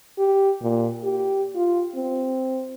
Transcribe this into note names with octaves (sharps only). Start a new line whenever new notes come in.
G4
A#2
G4
F4
C4